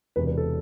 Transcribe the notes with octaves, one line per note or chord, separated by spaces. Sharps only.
E1 E2 C3 B4
B4
A4